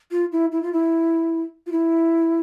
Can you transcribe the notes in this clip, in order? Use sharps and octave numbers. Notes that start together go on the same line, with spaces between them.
F4
E4
E4
F4
E4
F4
E4